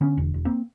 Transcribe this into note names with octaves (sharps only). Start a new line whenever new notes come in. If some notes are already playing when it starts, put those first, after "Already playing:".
D3 B3 C#4
E1
E1
A#3 C4